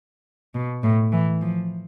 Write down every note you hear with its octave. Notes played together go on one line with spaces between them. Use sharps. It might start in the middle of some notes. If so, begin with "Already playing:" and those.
B2
A2
E3
F3